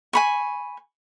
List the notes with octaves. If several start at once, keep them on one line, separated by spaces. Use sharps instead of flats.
G#5 B5 C#6